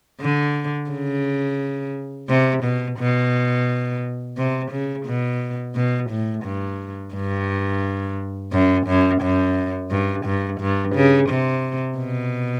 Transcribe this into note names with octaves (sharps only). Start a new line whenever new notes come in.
D3
C#3
C3
B2
B2
C3
C#3
B2
B2
A2
G2
G2
F#2
F#2
F#2
G2
G2
G2
C#3
C3
B2